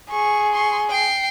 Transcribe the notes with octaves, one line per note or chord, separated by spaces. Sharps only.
G#4 C#6
C6 C#6
G5 C7